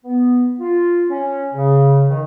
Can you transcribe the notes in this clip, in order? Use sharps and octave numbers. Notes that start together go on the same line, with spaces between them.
B3
F4
C#4
C#3
D#3